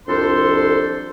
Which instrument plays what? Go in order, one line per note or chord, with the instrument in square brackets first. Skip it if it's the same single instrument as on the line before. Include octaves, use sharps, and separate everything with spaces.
[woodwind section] C2 F2 D4 A4 C5 C6